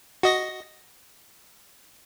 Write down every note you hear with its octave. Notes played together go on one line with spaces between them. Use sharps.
F#4 D#5 A#6